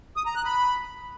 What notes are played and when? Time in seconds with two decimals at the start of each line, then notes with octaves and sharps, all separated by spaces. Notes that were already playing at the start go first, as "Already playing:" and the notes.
0.16 D#6
0.26 A#5
0.35 F#6
0.45 B5